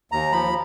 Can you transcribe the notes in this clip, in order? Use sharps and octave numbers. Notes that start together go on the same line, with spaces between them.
D#2 A#5
F3 B5